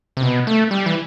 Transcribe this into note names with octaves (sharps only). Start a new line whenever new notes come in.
C3
B2
A3
G3
E3